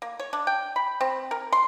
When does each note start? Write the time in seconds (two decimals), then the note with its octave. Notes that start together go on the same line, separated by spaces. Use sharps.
0.02 A#3
0.20 C#5
0.33 D4
0.47 G5
0.76 B5
1.01 C4
1.31 A#4
1.53 C6